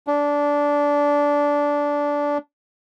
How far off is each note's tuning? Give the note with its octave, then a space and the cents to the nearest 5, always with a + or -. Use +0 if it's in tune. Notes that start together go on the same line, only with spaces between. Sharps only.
D4 -15